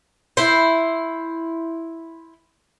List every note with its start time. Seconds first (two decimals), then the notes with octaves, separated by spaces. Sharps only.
0.37 E4 C5